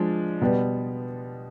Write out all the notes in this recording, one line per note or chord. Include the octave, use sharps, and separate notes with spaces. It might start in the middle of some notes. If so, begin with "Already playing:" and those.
Already playing: F3 G#3 D4
B2 G3 B3